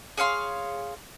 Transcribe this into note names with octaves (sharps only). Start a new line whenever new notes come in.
G#4 C#5 F5 C6